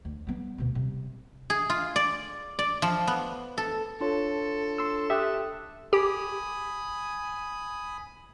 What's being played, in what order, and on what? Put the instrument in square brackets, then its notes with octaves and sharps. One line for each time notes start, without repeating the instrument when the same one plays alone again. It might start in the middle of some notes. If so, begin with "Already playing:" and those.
[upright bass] D2
G3 B3
D2 B2
C3 G3
[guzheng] G#4
F4
D5
D5
F3
B3
A4
[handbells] D4 F4 C#5 [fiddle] A4
[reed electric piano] C6 E6
[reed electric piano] G4 E5 [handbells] D#6 F#6
[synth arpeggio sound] G4 [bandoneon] G#5 B5 D#6